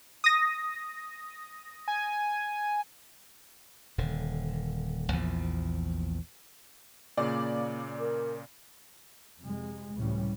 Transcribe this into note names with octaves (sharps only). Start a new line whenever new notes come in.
D#6 A#6
G#5
D#1 D3
A#1 E2 A#2 F3
A#2 C#3 A#3 D5
A#4
F2 C3 G#3
C#2 A2 C3 E3 G3 C#4